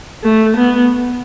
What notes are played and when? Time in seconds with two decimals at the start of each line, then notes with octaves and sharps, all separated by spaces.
0.23 A3
0.56 B3